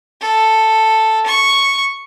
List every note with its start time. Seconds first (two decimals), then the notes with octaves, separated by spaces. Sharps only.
0.21 A4
1.26 C#6